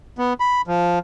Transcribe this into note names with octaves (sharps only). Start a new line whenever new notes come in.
B3
B5
F3